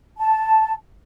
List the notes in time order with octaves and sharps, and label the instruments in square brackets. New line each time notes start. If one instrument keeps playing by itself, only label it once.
[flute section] A5